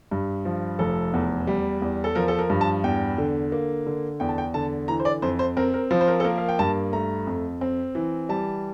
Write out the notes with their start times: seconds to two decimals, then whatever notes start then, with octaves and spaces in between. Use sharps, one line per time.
0.11 G2
0.45 F3
0.79 F1 A4
1.14 E2
1.47 G3
1.82 E2
2.04 A4
2.15 F3 A#4
2.28 A4
2.39 A#4
2.50 G2
2.61 A5
2.84 E2 G5
3.18 D3
3.52 A#3
3.86 D3
4.20 E2 G5
4.29 A5
4.38 G5
4.54 D3 A5
4.88 E3 A#5
5.00 C5
5.05 D5
5.22 F2 C5
5.39 C5
5.57 C4 A#4
5.74 A#4
5.91 F3 C5
6.01 C5
6.08 A#4
6.20 A4
6.24 A#3 A#4
6.38 F5
6.48 G5
6.59 G2 A5
6.93 A3 A#5
7.27 F2
7.61 C4
7.95 E3
8.29 G3 A5